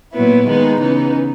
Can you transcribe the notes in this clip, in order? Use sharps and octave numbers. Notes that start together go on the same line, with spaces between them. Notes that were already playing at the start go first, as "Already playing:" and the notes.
A#2 F#3 B3 E4
D#3 G#3 B3 D#4
C#3 E3 B3 D#4